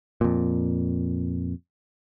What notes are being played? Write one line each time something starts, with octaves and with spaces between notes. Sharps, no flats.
F2 A#2